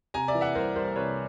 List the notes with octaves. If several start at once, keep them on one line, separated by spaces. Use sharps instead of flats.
C3 G#5 A#5
D5 E5
E3
E5 F#5
C2 A#4 C5
C2 A#4 C5
C3 B4 C#5